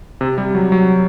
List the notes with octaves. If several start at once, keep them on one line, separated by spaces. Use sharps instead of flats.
C3
G3
F#3
F#3